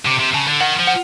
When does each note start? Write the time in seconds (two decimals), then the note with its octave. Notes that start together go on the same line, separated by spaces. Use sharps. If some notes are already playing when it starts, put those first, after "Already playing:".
0.06 C3 D6
0.20 C3
0.34 C#3 A5
0.47 D3
0.60 D#3 F#5
0.79 F3
0.87 F#5